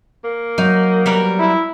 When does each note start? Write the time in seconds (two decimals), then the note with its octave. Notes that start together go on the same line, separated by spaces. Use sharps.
0.24 A#3
0.58 F#3 D#4
1.06 G3 B3 A#4
1.39 E4